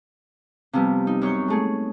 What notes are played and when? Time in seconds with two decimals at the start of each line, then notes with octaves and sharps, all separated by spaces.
0.73 C3 F3 G3 B3
1.07 D#4
1.22 F#2 C#5 C#6 G6
1.48 G#3 A3 G#4